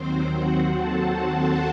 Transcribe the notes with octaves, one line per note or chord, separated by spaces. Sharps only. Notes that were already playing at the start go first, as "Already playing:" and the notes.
Already playing: D#2 D#3 F#3 C4 C5
F#4 F#5
A4 A5